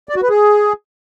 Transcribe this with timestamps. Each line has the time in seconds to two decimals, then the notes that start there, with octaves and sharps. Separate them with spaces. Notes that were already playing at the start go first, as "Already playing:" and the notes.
0.09 D5
0.16 F#4
0.23 B4
0.29 G#4